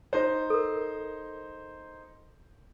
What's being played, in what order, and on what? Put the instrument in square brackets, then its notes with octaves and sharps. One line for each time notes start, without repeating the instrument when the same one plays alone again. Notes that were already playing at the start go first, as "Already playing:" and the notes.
[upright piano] D#4 C5
[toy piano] A4 A#4